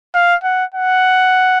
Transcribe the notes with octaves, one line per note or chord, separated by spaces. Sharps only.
F5
F#5
F#5